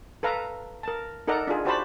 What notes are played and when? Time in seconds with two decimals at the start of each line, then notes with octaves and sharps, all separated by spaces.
0.23 A4 B4 F5 A#5
0.83 A#4 A5
1.27 D#4 A4 A#4 D5 F#5 A#5
1.47 D4 F4 G#4
1.65 F#4 G4 C5 D5 A5 B5